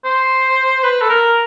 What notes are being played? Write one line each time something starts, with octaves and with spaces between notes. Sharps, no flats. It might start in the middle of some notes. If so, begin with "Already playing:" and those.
C5
B4
A4
A#4